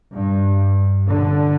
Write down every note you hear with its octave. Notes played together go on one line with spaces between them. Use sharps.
G2
D3